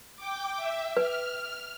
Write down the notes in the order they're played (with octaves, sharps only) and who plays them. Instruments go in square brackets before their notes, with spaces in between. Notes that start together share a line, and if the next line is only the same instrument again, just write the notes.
[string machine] G5 D6
E5
[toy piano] B4 [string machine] F6